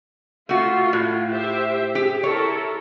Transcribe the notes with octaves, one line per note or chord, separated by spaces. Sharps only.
A3 F4 F#4
A2
G4 C5 E5
G4 G#4
E4 A4 A#4 C#5